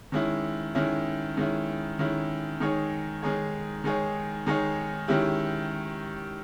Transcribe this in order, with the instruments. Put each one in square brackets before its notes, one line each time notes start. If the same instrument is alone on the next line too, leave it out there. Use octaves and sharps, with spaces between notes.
[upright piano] D#3 G#3 C#4 E4
D#3 G#3 C#4 E4
D#3 G#3 C#4 E4
D#3 G#3 C#4 E4
D#3 G#3 D#4 G#4 C#5
D#3 G#3 D#4 G#4 C#5
D#3 G#3 D#4 G#4 C#5
D#3 G#3 D#4 G#4 C#5
D#3 G#3 C#4 E4 G4